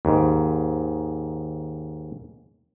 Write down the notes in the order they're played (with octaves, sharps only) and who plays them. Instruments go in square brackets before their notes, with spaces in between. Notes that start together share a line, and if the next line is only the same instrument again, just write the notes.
[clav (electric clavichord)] D#2 G#2